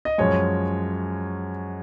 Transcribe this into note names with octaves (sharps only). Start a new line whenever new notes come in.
D#5
F#2 F3 G#3 C#5